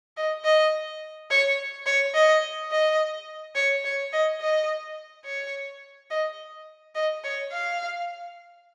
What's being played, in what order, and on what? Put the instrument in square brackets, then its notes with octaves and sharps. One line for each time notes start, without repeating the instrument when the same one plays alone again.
[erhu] D#5
D#5
C#5
C#5
D#5
D#5
C#5
C#5
D#5
D#5
C#5
D#5
D#5
C#5
F5